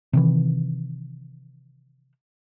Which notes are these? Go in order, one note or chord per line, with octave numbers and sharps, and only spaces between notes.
C3 D#3 E3